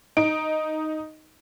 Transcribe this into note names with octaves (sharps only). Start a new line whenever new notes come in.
D#4 D7